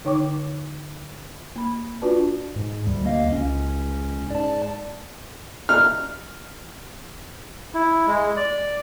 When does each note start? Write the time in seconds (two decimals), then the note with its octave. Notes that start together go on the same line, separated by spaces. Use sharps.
0.05 D3 D#4 C#5 G5 C#6 D6
1.56 A#3 B5
2.02 D4 F4 F#4 B4 D5 A5
2.56 G#2
2.87 D2 G3
3.05 A#3 D#5 F5
3.32 C#2 C#4
4.31 G#2 D5 A5
5.69 F6
7.74 E4
8.07 G#3
8.37 D5